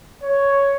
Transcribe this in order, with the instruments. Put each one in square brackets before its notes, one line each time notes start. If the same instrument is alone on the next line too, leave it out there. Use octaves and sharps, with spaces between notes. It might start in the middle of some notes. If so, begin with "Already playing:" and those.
[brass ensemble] C#5